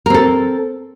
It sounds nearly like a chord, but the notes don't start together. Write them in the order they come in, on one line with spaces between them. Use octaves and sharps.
A#4 C4 A4